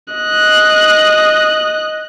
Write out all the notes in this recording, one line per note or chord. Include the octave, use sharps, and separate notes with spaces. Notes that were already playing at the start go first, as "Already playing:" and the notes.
D#5 F#6